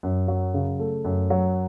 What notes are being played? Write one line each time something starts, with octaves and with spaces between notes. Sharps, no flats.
F#2
F#3
C#3
A3
F#2
F#3